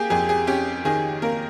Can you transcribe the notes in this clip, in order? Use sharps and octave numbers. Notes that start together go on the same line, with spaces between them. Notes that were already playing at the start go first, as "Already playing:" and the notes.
Already playing: A#3 G4 G#4
F2 G#4
G#4
C#4 G4
D#3 G#4
A#3 A#4